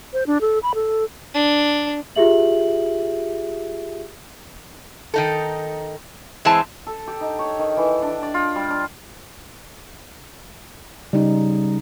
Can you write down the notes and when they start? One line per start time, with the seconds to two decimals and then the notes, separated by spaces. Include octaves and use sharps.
0.13 C5
0.27 D4
0.41 A4
0.63 B5
0.75 A4
1.34 D4
2.15 F4 G4 G#4 E5 F#7
5.14 D#3 D#4 A4
6.45 E3 G#3 C4 A5
6.87 A4
7.07 G4
7.21 D#4
7.39 C#5
7.59 D#3
7.77 E3
8.02 D4
8.23 D5
8.34 F4
8.55 G3
8.70 D4
11.13 C#3 G3 D#4